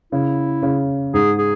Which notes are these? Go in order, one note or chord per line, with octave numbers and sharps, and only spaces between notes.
C#3 E4
C#3
G#2 G#4
G#4